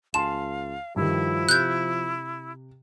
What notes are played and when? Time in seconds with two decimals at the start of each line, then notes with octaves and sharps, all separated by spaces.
0.14 C#2 F5 G#5 A5 C6 E7
0.96 G2 D#3 F3 E4
1.49 C3 F#6 G6